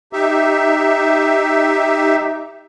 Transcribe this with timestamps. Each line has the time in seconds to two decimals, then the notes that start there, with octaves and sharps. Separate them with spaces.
0.13 D#4 G4 E5